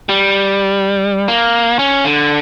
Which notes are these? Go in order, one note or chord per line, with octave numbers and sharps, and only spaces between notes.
G3
A#3
C#4
D3